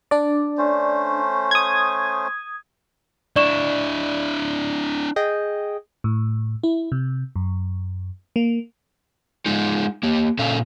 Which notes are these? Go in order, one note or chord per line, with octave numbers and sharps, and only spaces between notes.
D4 D5
A3 C#4 C5
D#6 G#6
D4 E4 D5 C#6 E7
G#4 D#5 G5
A2
E4
C3
F#2
A#3
G#3 D#4 F4
A#3 G4
A#2 C#4 A4 F5